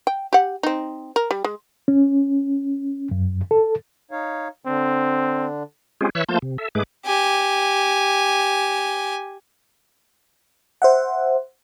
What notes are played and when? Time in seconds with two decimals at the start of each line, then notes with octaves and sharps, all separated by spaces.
0.07 G5
0.33 G4 F#5
0.63 C4 D#4
1.16 A#4
1.31 G3
1.44 G#3
1.88 C#4
3.11 F#2
3.51 A4
4.11 D#4 C#5 F5
4.66 D3 C4 D4
6.01 G#3 C4 C#4 F4 G4 G#4
6.15 E3 C#5 E5 E6 F#6
6.28 F3 A3 A#3 F4 A5 G6
6.42 C3
6.58 A4 E5
6.75 G#2 G#3 A3 G#4 B4 D6
7.05 G4 G#5
10.82 C5 E5 F#5